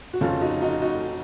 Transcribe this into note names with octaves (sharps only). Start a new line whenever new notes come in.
F#4
F1 F2 C#3 F4 A4
D#4 F#4
D#4 F#4
D#4 F#4